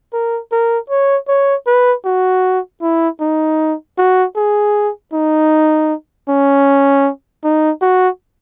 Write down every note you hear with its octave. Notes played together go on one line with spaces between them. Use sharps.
A#4
A#4
C#5
C#5
B4
F#4
E4
D#4
F#4
G#4
D#4
C#4
D#4
F#4